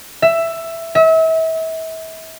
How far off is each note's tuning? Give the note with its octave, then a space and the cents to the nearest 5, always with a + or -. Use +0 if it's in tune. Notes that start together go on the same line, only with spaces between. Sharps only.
E5 +10
E5 -35